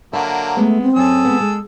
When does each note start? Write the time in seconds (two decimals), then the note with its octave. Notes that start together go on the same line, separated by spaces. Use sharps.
0.13 D3 F#3 A#3 E5
0.57 G#3 A3 B3
0.82 C4
0.96 F#2 G#4 A4 E6
1.25 G#3 B3
1.40 G#3